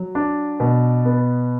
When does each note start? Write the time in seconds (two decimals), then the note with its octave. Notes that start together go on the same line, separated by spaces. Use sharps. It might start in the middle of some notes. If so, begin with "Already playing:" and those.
Already playing: F#3
0.15 D4
0.60 B2
1.05 B3